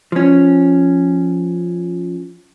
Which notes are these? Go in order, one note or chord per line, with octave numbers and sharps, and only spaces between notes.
F3 C#4